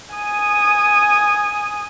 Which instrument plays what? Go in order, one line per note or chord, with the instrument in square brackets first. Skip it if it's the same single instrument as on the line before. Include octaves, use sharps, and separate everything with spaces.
[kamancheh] G#5 D#6